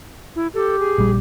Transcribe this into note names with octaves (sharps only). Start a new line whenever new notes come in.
E4
G4 A4
G#4
A#1 G3